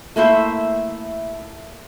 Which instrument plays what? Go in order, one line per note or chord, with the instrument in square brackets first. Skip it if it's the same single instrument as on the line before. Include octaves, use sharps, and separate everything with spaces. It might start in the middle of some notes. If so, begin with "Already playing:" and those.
[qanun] A3 A#3 E4 C5